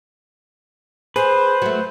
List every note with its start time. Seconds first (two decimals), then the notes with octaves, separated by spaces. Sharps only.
1.16 G#4 B4 C5
1.62 F#3 A3